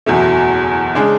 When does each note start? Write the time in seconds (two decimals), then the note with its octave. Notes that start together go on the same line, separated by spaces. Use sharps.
0.06 F#1 E2 B2 A3
0.95 C#3 G#3 D4